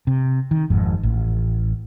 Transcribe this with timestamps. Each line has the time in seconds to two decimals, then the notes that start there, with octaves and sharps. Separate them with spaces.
0.07 C3
0.51 D#3
0.70 G#1 F2 G#2
1.03 A1